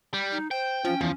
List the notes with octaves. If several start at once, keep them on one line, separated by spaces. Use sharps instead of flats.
G3
D#4
C5 G5
F3 C#4
E2 F3